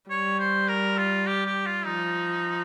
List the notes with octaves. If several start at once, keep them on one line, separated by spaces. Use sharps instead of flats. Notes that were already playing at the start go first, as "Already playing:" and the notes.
G3 C#5
C5
A#4
F4
G4
G4
F4
F3 D#4